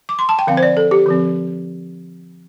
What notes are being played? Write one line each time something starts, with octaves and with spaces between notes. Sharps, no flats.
D6
C6
A5
G5
D3 F3 C4 F5
C5
D5
A4
G4
D3 F3 C4